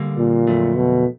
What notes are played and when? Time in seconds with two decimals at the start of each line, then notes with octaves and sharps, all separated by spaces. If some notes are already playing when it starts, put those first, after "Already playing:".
Already playing: D3 G3 A#3
0.17 A#2
0.47 F2 D3 F#3 A3
0.76 B2